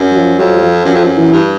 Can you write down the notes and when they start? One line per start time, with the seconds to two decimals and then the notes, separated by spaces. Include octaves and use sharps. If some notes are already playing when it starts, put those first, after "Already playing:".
Already playing: F#2
0.11 F#3
0.15 F3
0.39 F2 F#3
0.56 F#3
0.63 F3
0.85 F#2 F3
0.95 F2
1.04 F#2
1.17 E3
1.32 G2